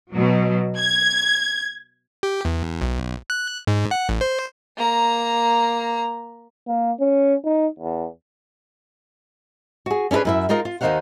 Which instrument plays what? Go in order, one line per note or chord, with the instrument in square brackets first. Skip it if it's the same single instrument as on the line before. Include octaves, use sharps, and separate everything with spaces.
[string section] B2 F#3
G#6
[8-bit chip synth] G4
E2
B1
F#6
G#2
F#5
A1
C5
[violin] A#3 A#5
[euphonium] A#3
C#4
D#4
E2
[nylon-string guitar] F#4 G#4
C#4 D4 E4 G#4 B4
F#2 E4 E5
G#3 D#4 F4 A#4 D#5
F4
D#2 D#3 D#4 C5 F5 F#5